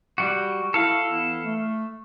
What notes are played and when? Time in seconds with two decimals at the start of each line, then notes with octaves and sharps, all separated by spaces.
0.18 G3 F#4
0.74 E4 F#4 A4 F5
1.10 E3 B3 E4
1.45 A3